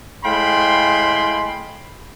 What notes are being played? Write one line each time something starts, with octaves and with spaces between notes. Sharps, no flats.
A2 G#3 F5 G5 B5 C6